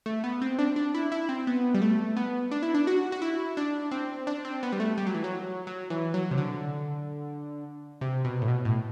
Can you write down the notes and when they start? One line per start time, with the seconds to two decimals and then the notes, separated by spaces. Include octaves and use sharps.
0.06 A3
0.24 B3
0.42 C4
0.59 D4
0.76 D4
0.94 E4
1.12 E4
1.29 C4
1.47 B3
1.74 G3
1.82 A3
2.17 B3
2.51 D4
2.63 E4
2.74 D4
2.87 F#4
3.12 F#4
3.22 E4
3.57 D4
3.91 C4
4.27 D4
4.45 C4
4.63 B3
4.73 G3
4.80 A3
4.98 G3
5.07 F#3
5.14 E3
5.24 F#3
5.67 F#3
5.90 E3
6.14 F#3
6.31 C3
6.38 D3
8.01 C3
8.25 B2
8.42 A2
8.48 B2
8.65 A2